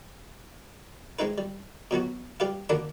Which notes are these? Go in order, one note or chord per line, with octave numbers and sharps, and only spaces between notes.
G#3 C4 D#4 B4
G3
B2 F#3 B3 F#4
G3 G4 B4 F5
A1 D2 A#3 D4 F#5 B5